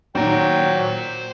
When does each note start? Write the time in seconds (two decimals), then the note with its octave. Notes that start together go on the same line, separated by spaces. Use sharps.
0.15 A#2 D#3 F#3 C5 G5 A#5